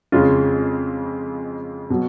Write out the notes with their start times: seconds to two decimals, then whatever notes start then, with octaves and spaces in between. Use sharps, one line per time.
0.12 F2 C#3 G#3 C#4 F4
1.90 B2 F#3